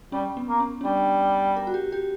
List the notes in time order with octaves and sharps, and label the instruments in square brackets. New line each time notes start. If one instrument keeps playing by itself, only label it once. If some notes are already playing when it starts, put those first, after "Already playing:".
[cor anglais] G3 [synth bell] C#4
[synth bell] B3
[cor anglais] A#3
[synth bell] C#4
C#4
[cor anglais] G3 [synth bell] D4
[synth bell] A#4
F#4
G4
G4